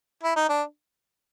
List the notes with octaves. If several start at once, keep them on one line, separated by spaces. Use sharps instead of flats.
E4
D#4
D4